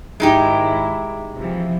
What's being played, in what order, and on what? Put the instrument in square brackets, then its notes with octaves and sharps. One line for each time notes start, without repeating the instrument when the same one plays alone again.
[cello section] G#2 D#3 E4 [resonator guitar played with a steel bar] G#3 D#4 G4
[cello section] C3 E3 F3